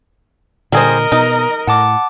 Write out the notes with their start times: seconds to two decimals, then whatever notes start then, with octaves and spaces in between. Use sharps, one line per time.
0.72 A#2 D3 G3 G#4 A#4 C5 D#5
1.12 B2 D#4
1.67 A2 F#5 A5 D6